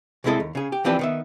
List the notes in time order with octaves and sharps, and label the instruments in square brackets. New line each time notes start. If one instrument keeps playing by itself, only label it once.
[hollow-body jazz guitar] C2 G#3 C4 E4 A4 D#5
D#2
C#3 G#4
G4
E3 F3 C4 D4 G4 B4
D#3 B3 E5